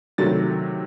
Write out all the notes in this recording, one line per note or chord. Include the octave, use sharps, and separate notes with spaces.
C3 D#3 F#3 A3 A6